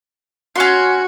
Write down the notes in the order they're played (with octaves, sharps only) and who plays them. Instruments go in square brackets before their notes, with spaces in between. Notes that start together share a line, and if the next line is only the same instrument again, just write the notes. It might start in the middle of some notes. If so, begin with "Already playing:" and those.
[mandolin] C#4 C6 [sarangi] F#4